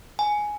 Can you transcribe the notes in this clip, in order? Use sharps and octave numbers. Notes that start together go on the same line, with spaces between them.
G#5